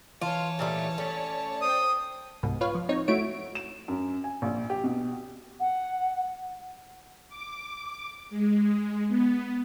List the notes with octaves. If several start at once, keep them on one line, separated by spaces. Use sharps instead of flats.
E3 F4 C#5 A5
A#2 G3 A3
A3 C#4 D5
C5 G5 D#6
C2 G#2 B2
F4 B4 C#5 F5
F3
C4 D#4 C#5
A3 E4 F#4 C#5 D7
E7
F#2
G#5
A#1
G4
B2
F#5
D6
G#3
B3